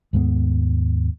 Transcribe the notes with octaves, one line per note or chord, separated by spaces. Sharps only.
D#2 G#2 G#3 B3